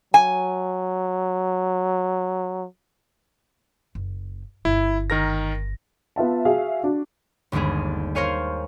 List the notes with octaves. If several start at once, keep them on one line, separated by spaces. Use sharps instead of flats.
F#3 G#5
F#1
G1 E4
D#3 A#4 A#6
B3 F4 E5 A5
F#4 G#4 E5 F5
D4 F#4
G1 D#2 G#3 B3 G#4
A#4 C5 C#5 F5 G#5